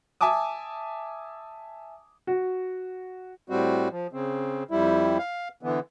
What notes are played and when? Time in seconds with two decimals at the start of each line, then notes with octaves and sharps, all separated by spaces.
0.21 E5 G#5 A5 D6 D#6
2.27 F#4
3.50 A2 G3 C4 F#4
3.91 F3
4.13 C#3 C4
4.71 F2 G3 E4
5.18 F5
5.63 D3 E3 B3